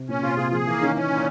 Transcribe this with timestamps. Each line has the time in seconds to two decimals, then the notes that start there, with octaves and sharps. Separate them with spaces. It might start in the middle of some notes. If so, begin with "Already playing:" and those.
Already playing: C3
0.08 A#2 C#4
0.23 C3 F4
0.37 C3 G#4
0.51 F3 G#4
0.66 E3 A#3
0.81 D#3 C#4
0.95 E3 C#4
1.10 A#2